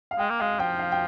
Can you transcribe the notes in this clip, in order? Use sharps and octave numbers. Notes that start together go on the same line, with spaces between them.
F5
G#3 G5
A#3
G#3 F5
F3 G5
F5
G5